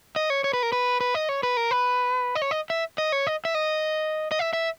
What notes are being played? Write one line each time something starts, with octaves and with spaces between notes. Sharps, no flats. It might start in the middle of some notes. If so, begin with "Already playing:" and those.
D#5
C#5
C#5
B4
A#4
B4
B4
D#5
C#5
B4
A#4
B4
D#5
C#5
D#5
E5
D#5
C#5
D#5
E5
D#5
D#5
E5
E5